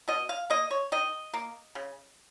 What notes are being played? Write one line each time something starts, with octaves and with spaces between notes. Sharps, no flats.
B2 D#5
F5
A#3 D#5
C#5
D#3 D#5
A#3
C#3